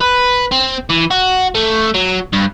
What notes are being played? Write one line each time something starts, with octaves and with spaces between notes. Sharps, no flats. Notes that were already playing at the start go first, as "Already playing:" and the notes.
B4
C4
E3
F#4
A3
F#3
G2